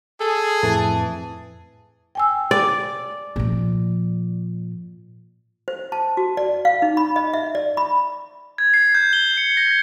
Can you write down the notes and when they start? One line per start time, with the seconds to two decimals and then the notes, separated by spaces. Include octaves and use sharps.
0.20 G#4 A4
0.63 F2 A2 E3 A5
2.15 G5 G#5 E6
2.51 D5
3.36 A#2 F3
5.68 C5
5.92 A5
6.17 F#4
6.37 D5
6.65 F5
6.82 D#4
6.97 B5
7.16 D#5
7.34 E5
7.55 D5
7.77 B5
8.58 G#6
8.74 C7
8.95 G6
9.13 G7
9.37 C#7
9.57 A#6